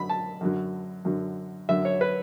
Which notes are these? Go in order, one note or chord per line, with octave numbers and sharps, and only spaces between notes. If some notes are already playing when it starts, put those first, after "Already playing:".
Already playing: F#2 D3 F#3 B5
A5
F#2 D3 F#3
F#2 D3 F#3
F#2 D3 F#3 E5
C#5
B4